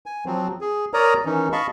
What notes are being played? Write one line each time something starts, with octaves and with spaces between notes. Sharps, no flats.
G#5
F3 F#3 C4
G#4
A#4 C#5 D5 A#5 D#6
D#3 E3 C#4 D#4
D#5 F5 A5 B5 C#6